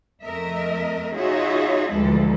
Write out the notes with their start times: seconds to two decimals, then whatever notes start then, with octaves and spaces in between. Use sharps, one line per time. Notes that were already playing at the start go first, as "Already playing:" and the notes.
0.24 F2 A3 A#4 D#5 E5
1.15 D#4 F4 F#4 G#4 C#5 E5
1.91 D2 E3 F3 G#3 A4